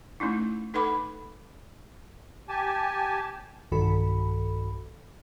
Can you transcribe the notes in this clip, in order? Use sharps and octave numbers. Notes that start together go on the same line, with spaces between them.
A3 C#4 D#4 E4
D#4 A4 B4 F#5 B5 D6
G4 G#5 A5
B1 G2 D#3 F#4 A4 B5